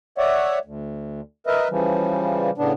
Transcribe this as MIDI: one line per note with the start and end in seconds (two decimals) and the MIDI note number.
0.18 0.59 73
0.18 0.59 74
0.18 0.59 76
0.18 0.59 78
0.65 1.21 38
1.47 1.68 70
1.47 1.68 71
1.47 1.68 75
1.47 1.68 76
1.70 2.50 49
1.70 2.50 52
1.70 2.50 53
1.70 2.50 55
2.58 2.73 45
2.58 2.73 49
2.58 2.73 59
2.58 2.73 62